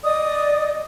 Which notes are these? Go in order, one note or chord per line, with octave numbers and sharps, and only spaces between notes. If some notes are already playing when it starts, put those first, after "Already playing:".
D5 D#5 D#6